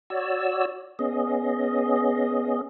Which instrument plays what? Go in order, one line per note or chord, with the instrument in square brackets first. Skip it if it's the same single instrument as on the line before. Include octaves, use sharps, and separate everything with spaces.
[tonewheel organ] F#4 C#5 D5 E6
B3 C#4 G#4 D#5